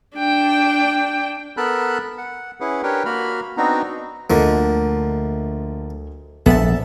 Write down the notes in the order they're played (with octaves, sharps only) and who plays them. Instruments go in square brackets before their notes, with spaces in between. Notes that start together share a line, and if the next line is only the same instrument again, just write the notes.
[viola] D4 G5
[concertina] B3 A4 A#4 A5 B5 F#6
F#5
C#4 E4 G#4 B4 F#5
D4 G4 A#4 B4 C#5 G5
A#3 F#4 B5 F6
B3 C4 D4 D#4 F#4 A#5
[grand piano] D2 D#5 [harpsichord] D3 F3 A#3
[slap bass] A#1 [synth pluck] B3 A4 [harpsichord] E5 A5